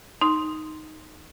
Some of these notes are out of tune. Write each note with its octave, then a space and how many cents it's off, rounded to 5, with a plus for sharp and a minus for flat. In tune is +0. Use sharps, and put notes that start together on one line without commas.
D#4 +0 C6 +0